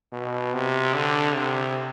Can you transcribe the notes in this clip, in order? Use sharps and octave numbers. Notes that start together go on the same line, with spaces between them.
B2
C3
D3
C3